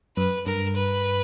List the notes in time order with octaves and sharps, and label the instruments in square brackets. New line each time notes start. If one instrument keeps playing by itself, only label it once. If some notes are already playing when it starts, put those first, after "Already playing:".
[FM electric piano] F#2 [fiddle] B4
[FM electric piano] G2 [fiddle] A#4
[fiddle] B4